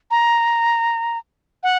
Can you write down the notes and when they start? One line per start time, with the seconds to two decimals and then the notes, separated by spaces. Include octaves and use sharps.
0.11 A#5
1.63 F#5